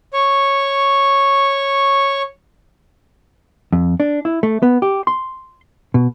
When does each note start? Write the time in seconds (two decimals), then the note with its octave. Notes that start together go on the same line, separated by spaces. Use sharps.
0.13 C#5 C#6
3.72 F2
4.00 D4
4.25 E4
4.43 A3
4.63 B3
4.82 G4
5.07 C6
5.94 B2